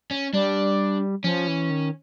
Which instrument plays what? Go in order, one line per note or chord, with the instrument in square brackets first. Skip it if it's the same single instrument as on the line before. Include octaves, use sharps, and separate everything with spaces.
[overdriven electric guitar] C#4
[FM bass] G3 [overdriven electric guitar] D4
[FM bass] F3 [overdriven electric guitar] C#4
[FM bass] E3
D#3